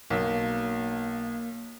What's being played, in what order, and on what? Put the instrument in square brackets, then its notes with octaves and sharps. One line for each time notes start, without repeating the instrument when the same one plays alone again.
[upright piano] B1 [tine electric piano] A#3 E6